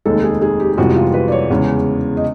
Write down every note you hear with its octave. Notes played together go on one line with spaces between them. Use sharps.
F1 D#2 D#3 G#3 A4
G#4
G#4
G4
G4
G1 F2 C3 E3 G#3 F#4
F4
B4
D5
C#5
E2 C#3 E3 G#3 C#4
D#5